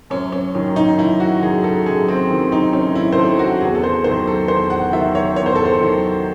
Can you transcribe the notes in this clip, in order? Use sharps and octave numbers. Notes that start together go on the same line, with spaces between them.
F#2 C#4
C#4
D#3 F#3 C#4
D#4
F#2 E4
F#4
D#3 F#3 G#4
A4
F#2 G#4
C4
D#3 F#3
D#4
F#2 C#4
E4
C5
D#3 F#3 A4
F#4
E2 G#4
A4
C5
D#3 F#3 C5
A4
E2 C5
F#5
D#3 F#3 E5
C#5
E2 C#5
C5
A4
C5
D#3 F#3